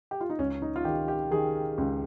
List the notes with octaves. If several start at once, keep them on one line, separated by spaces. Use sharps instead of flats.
G4
F4
D#4
C#2 C#4
D#4
F4
D#3 G4
G4
D#3 G#4
C#2